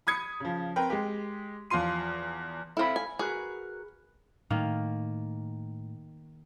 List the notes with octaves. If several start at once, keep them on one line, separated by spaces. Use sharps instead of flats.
B5 D#6 G#6 C#7
C#3 F3
C4 A#4 B4 G5
G#3 G4
E2 F3 F4 C6 D#7
C4 E4 A4 F5 B5
G#5
F#4 G#4 A#4 B4
A2 D#3 A#3